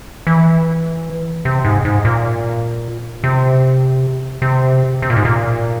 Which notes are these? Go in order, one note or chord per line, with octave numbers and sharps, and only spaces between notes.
E3
C3
G#2
G#2
A#2
C3
C3
C3
A#2
G#2
A#2